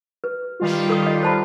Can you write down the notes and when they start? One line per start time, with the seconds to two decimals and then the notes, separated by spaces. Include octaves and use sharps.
0.24 B4
0.60 D#3 G3 F4
0.89 A4 D#6
1.03 D#5 D6
1.23 C5 A5 B5